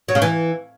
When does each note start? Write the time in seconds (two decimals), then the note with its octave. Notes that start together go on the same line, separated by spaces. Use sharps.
0.08 F#3
0.15 C#3
0.22 E3